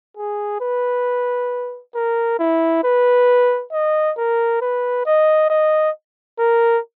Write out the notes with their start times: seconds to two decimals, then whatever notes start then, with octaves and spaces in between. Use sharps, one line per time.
0.17 G#4
0.61 B4
1.95 A#4
2.39 E4
2.84 B4
3.72 D#5
4.18 A#4
4.61 B4
5.06 D#5
5.50 D#5
6.39 A#4